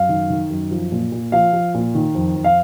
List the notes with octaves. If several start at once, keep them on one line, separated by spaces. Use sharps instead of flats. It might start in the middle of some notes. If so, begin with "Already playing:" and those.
Already playing: F#2 F5
D#3
D#3
F#2
F3
A#2
A#2
F3 F5
F3
A#2
D#3
F2
F2
F5